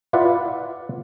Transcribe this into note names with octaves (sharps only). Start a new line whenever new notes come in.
E4 F4 B4 D5 F5 F#5